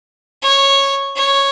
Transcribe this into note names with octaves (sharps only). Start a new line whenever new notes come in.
C#5
C#5